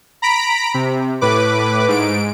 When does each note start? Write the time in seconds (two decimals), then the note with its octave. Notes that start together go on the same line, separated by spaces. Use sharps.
0.22 A#5 B5 B6 D7
0.74 C3
1.21 A2 B4 D6
1.88 G#2 D7